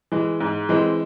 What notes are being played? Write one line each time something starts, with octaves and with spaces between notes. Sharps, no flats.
E3 G#3
G#2
E3 G#3 C4